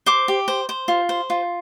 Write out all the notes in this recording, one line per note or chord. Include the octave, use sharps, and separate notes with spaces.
C5 D6
G4
C5
C5
F4
C5
F4